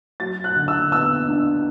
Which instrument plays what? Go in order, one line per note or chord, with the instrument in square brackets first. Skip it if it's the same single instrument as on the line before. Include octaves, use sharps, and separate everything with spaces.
[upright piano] F#3 A6
F#6
D3
E6
B3 E6
D4